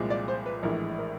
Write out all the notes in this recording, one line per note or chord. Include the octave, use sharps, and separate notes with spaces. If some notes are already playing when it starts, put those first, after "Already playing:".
Already playing: C2 A#2 F3 G#3
D5
C5
B4
A#1 A2 E3 G#3 A#4
A#4